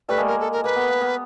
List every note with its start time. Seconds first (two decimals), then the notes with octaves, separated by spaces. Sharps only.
0.09 G3 A3 B4
0.18 G#3 A#3
0.27 A#4
0.40 A4
0.52 A#4
0.64 A#3 B4
0.76 B3
0.89 A#3
1.01 B3